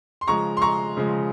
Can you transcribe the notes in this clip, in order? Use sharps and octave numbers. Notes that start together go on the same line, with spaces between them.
C6
C#3 F3 G#3 A#5 C#6
C6
A#5 C#6
C#3 F3 G#3